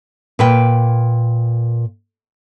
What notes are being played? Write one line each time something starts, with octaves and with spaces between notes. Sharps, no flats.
A#2 B4 G5